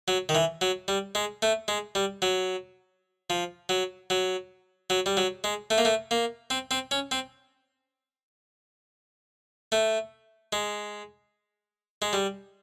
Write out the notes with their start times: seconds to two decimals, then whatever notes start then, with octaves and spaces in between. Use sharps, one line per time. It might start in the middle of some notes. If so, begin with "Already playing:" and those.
0.08 F#3
0.29 D#3
0.35 E3
0.61 F#3
0.88 G3
1.15 G#3
1.42 A3
1.68 G#3
1.95 G3
2.22 F#3
3.30 F3
3.69 F#3
4.10 F#3
4.90 F#3
5.06 G3
5.17 F#3
5.44 G#3
5.70 A3
5.78 A#3
5.85 A3
6.11 A#3
6.50 C4
6.71 C4
6.91 C#4
7.11 C4
9.72 A3
10.53 G#3
12.02 G#3
12.13 G3